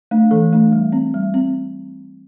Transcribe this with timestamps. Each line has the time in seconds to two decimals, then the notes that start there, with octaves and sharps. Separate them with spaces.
0.11 A3 D4
0.31 E3 A4
0.52 A3 D4
0.72 G3
0.93 C4
1.14 G3
1.34 C4